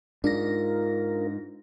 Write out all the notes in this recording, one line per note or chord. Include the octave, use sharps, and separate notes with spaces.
G#2 D4 F4 A#4 A#6